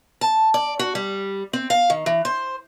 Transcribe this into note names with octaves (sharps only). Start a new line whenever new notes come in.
A5
D5
F#4
G3
C4
F5
D#3
E3
C5